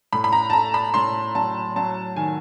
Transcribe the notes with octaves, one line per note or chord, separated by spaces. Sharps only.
A2 B5
B5
A#5
A5
A3 A#5
B5
A2 C6
F#3 A5
F#3 A5
D#3 G#5